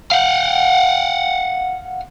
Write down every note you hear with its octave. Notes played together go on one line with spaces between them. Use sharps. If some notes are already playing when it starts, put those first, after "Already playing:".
F5 F#5